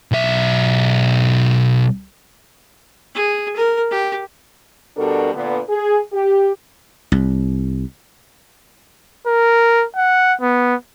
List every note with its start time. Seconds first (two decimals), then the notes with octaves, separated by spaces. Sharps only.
0.11 B1 E5
3.15 G#4
3.56 A#4
3.91 G4
4.97 B2 G3 D4 F#4 A4 A#4
5.34 A#2 D3 B3
5.69 G#4
6.13 G4
7.12 C2
9.26 A#4
9.96 F#5
10.41 B3